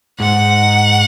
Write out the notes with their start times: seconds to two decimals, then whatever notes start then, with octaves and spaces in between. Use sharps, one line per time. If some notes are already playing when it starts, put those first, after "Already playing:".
0.20 G#2 F#5